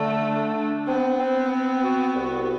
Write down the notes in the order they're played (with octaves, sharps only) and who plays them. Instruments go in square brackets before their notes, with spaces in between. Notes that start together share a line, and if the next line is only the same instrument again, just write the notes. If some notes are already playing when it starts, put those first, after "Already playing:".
Already playing: [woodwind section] D3 [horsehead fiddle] A3
[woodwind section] D4
D4
[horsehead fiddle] B3 [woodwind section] C4
[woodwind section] C4
C4
F#4
C2